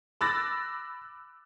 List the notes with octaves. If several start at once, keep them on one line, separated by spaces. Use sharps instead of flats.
B5 D6 E6 F#6 A6 A#6